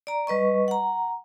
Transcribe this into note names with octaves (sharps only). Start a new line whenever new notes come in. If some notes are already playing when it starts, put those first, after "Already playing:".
D5 A#5
G3 B4 D#5 C#6
F#5 A#5